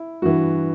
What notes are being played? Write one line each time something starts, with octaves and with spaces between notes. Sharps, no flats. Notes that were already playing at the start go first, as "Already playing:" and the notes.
Already playing: E4
G2 E3 F#4